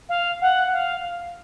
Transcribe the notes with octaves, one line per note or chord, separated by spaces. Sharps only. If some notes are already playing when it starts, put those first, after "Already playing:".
F5
F#5
F5